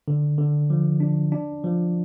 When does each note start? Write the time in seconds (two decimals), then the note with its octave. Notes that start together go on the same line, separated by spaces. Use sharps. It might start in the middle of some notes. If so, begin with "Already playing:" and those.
0.08 D3
0.38 D3
0.70 F3
1.00 D4
1.32 D4
1.64 F3